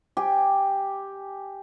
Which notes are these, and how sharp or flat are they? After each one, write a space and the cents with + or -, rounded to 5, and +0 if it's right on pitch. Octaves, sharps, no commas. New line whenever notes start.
G4 +0 G#5 +0